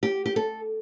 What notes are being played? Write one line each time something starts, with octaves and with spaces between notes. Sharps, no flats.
G4
G4
A4